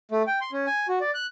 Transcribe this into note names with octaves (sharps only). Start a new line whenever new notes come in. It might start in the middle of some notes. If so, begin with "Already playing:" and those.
A3
G5
C6
C#4
G#5
F#4
D5
F#6